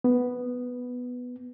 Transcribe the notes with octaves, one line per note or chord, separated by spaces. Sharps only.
B3